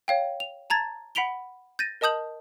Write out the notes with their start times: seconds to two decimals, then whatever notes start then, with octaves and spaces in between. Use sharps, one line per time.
0.08 C#5 F5 G5
0.40 F7
0.70 A5 A#5 G#6 A6
1.15 F#5 B5 B6 D7 F7 G7
1.79 G6 A6 A#6 D#7
2.01 A#4 D#5 A5 D#6 G6 F#7